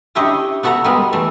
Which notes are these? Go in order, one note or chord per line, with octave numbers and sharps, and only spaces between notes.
C#4 D4 E4 G4 C#5 D#5
B3 F#4 A4 E5 F#5 A#5
G3 G#3 B3 G#4 A#4
E3 A3 D5